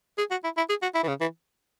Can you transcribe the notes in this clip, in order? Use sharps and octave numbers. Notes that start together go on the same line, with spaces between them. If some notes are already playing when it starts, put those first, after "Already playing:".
G#4
F#4
E4
E4
G#4
F#4
E4
E3
C#3
E3